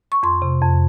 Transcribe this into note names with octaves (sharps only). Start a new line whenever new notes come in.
C#6
F2 C6
C3
F2